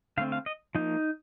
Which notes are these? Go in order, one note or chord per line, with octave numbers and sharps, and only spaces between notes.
D3 A3 C4 F5
F5
D#5
F3 A#3 D#4